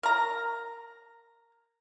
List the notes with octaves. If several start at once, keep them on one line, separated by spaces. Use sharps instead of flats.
A#4 A#5